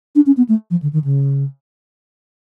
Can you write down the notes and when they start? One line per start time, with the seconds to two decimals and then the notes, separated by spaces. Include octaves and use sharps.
0.15 D4
0.26 C#4
0.37 B3
0.49 A3
0.71 F3
0.82 D3
0.93 D#3
1.04 C#3